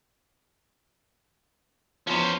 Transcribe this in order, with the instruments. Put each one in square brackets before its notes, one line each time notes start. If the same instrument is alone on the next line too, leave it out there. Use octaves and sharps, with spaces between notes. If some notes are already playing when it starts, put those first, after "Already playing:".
[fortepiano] E2 F3 [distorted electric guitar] C#4 C5